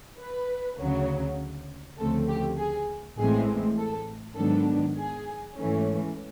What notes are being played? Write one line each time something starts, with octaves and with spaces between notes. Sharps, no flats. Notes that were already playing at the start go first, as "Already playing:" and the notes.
B4
D2 C#3 F#3
D2 C#3 F3 A3 C4 A4
G4
G#4
A1 A2 E3 G#3 C4 G#4
A4
G#2 D#3 F#3 B3 D4 A4
G#4
G#2 E3 A3 C#4